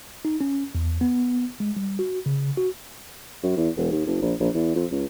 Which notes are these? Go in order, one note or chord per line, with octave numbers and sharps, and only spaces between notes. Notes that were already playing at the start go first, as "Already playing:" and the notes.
D#4
C#4
E2
B3
G#3
G3
F#4
C#3
F#4
F#2
E2
E1
D#2
F#1
A#1
A#1
E2
F2
C#2